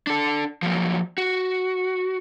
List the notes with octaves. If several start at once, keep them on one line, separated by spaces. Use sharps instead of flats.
D4 A4
F3 F#3 A#3
F#4